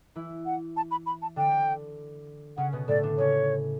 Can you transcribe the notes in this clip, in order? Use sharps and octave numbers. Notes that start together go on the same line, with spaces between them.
E3 E4
F#5
A5
B5
B5
A5
D3 D4 G5
C#3 C#4 F#5
B2 B3
A2 A3 D5
D3 D4
C#3 C#4 C#5